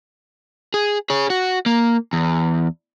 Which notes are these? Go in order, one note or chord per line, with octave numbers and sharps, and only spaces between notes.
G#4
G#4 C#5
F#4
A#3
E2